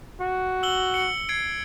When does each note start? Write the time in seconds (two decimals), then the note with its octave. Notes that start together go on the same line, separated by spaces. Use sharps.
0.20 F#4
0.63 E6 F#7 G7
0.94 C#7 F#7
1.29 G#6 C7 D7